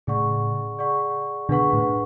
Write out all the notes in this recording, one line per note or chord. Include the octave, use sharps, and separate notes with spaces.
A2 C#3 G#4 D5 F#5 C#6
G#4 D5 F#5 C#6
B2 D3 D4 G#4 B4 F#5 C#6
A2